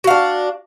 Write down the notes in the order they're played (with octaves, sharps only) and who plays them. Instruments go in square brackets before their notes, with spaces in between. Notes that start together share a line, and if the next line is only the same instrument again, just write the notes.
[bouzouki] F#4
F5
D4